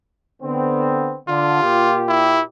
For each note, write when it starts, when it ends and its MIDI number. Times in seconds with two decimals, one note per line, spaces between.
0.42 1.17 50
0.42 1.17 59
0.42 1.17 60
1.28 1.59 50
1.28 2.02 65
1.62 2.41 46
1.62 2.41 67
2.08 2.42 64